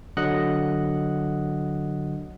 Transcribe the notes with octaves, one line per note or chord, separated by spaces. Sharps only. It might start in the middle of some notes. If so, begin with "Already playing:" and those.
D3 F#3 D#5 F#5 F#6